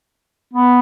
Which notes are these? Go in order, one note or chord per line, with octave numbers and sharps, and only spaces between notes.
B3